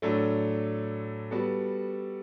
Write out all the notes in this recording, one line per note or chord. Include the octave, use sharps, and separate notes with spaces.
A2 F#3 A3 D4 A4
G3 B3 F#4 A4